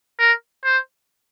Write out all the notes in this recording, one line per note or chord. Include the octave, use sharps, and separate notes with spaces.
A#4
C5